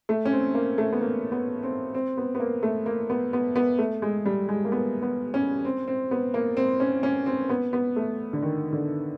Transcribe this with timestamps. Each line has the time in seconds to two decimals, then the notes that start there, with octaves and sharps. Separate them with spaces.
0.09 A3
0.25 C#4
0.32 C4
0.55 A#3
0.78 A3
0.92 B3
1.01 A#3
1.32 B3
1.63 C4
1.94 C4
2.17 B3
2.35 B3
2.40 A#3
2.63 A3
2.86 A#3
3.10 B3
3.33 B3
3.56 B3
3.79 A3
4.02 G#3
4.26 G3
4.49 G#3
4.65 A#3
4.72 B3
5.02 B3
5.34 C#4
5.65 C4
5.88 C4
6.11 B3
6.34 A#3
6.57 C4
6.80 C#4
7.03 C#4
7.26 C4
7.49 B3
7.73 B3
7.96 A3
8.33 D3
8.42 D#3
8.73 D3